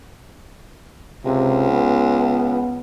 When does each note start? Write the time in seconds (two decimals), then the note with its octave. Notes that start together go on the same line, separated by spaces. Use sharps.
1.25 C#2 C3
1.71 B3